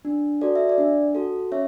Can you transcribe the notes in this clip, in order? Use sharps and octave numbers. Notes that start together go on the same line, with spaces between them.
D4
F#4 A4 D5
E5
D5
D4
F#4 A4
C#4 C#5 E5